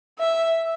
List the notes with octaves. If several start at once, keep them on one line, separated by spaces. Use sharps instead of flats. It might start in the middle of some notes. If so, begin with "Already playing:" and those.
E5